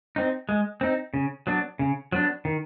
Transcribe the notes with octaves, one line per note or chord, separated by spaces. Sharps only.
C4 D#4
G#3
C4 D#4
C#3
F#3 B3 D4
C#3
F#3 B3 D4
D#3